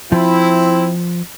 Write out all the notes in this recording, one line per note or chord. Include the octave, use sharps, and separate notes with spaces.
F3 C4 E4